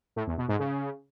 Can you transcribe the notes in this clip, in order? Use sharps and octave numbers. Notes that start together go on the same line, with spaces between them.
A2
E2
B2
G#2
C#3